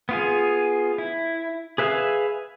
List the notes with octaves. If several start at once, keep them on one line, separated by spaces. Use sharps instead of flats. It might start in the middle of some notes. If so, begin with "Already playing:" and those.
B3 F4 G#4
E4
G#4 B4 E5 F5 G#5